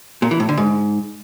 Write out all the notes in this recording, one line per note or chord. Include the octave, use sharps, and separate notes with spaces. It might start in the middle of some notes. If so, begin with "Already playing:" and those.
A#2
E3
A2
D3
G#2